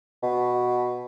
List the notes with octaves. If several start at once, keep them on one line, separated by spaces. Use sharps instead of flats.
B2